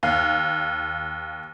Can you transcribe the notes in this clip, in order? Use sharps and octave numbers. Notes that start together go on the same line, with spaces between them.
D#2 F5